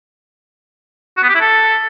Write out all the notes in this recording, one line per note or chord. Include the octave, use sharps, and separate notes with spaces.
F#4
B3
G4
E4
A4